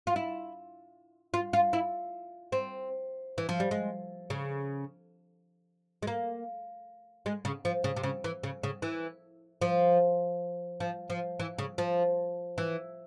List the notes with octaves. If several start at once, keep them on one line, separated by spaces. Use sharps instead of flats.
F4
E4
F4
F4
E4
C4
E3
F3
G3
G#3
C#3
G#3
A#3
G#3
C#3
F3
C#3
C3
C#3
E3
C#3
C#3
E3
F3
F3
F3
E3
C#3
F3
E3